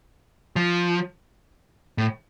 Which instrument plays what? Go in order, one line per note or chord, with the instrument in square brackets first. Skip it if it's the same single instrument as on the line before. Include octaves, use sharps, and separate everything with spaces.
[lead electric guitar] F3
A2